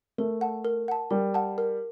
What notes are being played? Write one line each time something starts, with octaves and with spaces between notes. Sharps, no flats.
A3 A#4
F#5 A5
A#4
F#5 A5
G3 A#4
F#5 A5
A#4